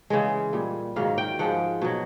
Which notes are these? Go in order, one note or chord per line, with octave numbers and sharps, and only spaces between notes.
C#3 E3 G#3
A#2 G3
G#2 D#3 F#3 F5
G5
G#2 F3 G#3 F#5
B2 F#3